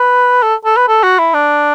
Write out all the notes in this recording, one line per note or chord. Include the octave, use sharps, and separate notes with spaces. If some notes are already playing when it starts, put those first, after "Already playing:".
Already playing: B4
A4
A4
B4
A4
F#4
E4
D4